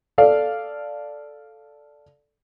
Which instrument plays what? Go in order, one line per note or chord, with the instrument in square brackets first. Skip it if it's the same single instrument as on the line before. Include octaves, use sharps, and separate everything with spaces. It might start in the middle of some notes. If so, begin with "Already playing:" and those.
[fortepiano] A4 D5 F5